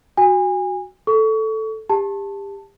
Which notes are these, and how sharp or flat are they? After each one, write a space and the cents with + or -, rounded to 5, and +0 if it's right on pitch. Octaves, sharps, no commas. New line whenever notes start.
F#4 +0 G#5 -30
A4 +0 C#6 +30
G4 +30 A5 +0